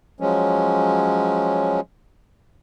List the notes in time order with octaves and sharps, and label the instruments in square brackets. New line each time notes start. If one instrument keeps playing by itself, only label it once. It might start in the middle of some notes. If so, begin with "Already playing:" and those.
[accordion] F3 F#3 G#3 C#4